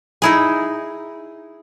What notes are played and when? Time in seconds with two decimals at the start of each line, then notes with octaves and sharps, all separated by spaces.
0.22 D#4 E4 G#4